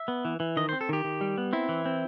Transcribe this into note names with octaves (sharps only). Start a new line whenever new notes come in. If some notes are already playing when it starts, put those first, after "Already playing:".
Already playing: E5
B3
E3
E3
D#3 D#5
C5
C4
A4
D#3 G4
D#3
G3
B3
C4 E4
E3
C4